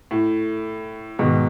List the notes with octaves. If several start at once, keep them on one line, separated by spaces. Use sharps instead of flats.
A2
G#2 B2 D#3 G#3